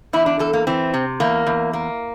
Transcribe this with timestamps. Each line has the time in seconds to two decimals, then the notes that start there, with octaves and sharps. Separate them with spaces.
0.13 E2 E4
0.26 D4
0.39 E2 A4
0.53 A#3
0.67 E3 C4
0.94 C3
1.20 E2 A#3
1.47 E2
1.73 A#3